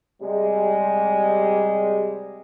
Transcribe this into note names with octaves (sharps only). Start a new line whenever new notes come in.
C3 G3 G#3